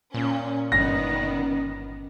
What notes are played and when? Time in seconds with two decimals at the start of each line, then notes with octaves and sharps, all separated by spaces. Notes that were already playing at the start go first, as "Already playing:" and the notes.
0.14 A#2 C#4
0.72 G1 G2 D#3 B3 C#4 A#6